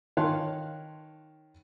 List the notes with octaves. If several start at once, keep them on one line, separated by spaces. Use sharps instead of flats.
D#3 C#5 F5 A5 C6 F#6